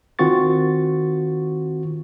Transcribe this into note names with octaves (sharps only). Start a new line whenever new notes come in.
D#3 C4 F4 F#4 C#6 A6